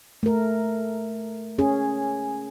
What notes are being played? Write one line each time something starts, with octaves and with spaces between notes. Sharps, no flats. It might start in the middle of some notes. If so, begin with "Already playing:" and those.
A3 A#4
C#4 G#4